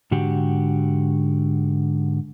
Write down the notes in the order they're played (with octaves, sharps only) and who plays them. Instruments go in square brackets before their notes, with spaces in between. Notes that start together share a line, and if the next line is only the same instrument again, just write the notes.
[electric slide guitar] G#2 D3 F#4 G4